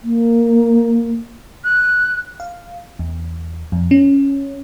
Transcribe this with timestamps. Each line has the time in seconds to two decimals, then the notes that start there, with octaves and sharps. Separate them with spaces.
0.04 A#3
1.64 F#6
2.40 F5
2.99 E2
3.72 F2
3.91 C#4